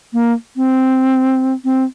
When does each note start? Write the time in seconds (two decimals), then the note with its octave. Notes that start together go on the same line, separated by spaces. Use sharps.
0.13 A#3
0.56 C4
1.64 C4